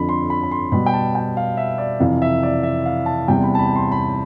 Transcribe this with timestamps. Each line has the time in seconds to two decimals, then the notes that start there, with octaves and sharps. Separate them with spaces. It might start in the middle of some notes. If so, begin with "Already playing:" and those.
Already playing: F2 D3 F3 B5
0.09 C6
0.30 B5
0.43 B5
0.51 C6
0.72 B2 G3 B5
0.86 G5
0.93 A5
1.15 G5
1.37 F5
1.57 E5
1.78 D5
2.00 F2 C3 E3 F5
2.22 E5
2.43 D5
2.63 E5
2.86 F5
3.06 A5
3.28 E2 C3 G3 G5
3.44 B5
3.55 A5
3.59 B5
3.75 C6
3.92 B5